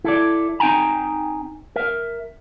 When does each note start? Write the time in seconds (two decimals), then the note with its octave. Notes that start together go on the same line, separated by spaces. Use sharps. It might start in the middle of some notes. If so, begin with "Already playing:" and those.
0.04 E4 A4 D5
0.60 C4 D#4 G5 G#5 A#5
1.76 A#4 E5